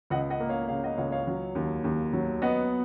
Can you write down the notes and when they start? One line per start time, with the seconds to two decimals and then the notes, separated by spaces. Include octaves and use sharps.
0.10 C#2 D#5 F#5
0.30 D#5 F#5
0.40 A#3
0.49 C#5 F5
0.68 C#3 C#5 F5
0.83 D#5 F#5
0.97 C#2 C#5 F5
1.12 C#5 F5
1.27 F#3
1.55 D#2
1.84 D#2
2.13 F#3
2.42 B3 D#5 F#5